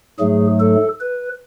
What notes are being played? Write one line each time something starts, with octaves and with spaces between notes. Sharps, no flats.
G#2 F#3 A3 G#4
A4
B4